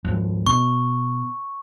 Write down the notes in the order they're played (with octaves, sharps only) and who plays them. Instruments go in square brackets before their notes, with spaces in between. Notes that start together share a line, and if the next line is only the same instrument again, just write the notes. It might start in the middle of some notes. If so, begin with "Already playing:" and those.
[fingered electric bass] F2 G#2
[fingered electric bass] B2 [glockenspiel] C#6